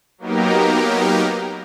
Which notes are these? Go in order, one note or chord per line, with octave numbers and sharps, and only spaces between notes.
F#3 A#3 B3 D#4 G4 A#4